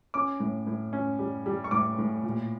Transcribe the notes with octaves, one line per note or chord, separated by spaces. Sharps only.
C#4 D6
A2
A2
C#4
G3
G3
C#6
A2 D6
A2
A#2